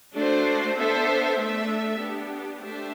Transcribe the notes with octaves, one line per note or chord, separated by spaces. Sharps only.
A3 D4 F#4 C5
B3 D4 A4 C5 E5
A3 D4 A4 E5
B3 D4 G4
A3 D4 G4 C5 E5